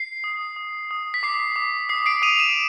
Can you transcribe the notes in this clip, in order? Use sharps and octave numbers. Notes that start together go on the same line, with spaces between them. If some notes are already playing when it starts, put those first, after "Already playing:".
Already playing: C7
D#6
D#6
D#6
B6
D6 C7
D6
D#6 C7
C7 D7
D#6 D#7 F7
D7 E7